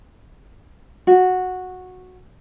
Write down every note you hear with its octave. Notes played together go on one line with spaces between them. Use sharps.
F#4